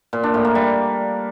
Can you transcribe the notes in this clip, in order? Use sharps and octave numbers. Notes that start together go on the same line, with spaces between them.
A#2
D4
A2
A#3
G3